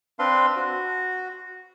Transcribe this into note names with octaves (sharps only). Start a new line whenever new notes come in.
C4 D4 B4 F5 C6
F#4